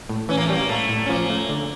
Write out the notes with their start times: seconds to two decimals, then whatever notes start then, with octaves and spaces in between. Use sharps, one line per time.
0.09 A2
0.29 E3 C#4
0.38 A#3
0.46 A3
0.49 G3 A#3
0.69 A2 A3
0.89 A2
1.06 C#4
1.09 F3 A#3
1.30 A3
1.49 D3